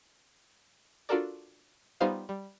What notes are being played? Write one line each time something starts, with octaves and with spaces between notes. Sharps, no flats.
D4 F4 F#4 A4 A#4 D5
G3 B3 D#4 F4 C5 F5
G3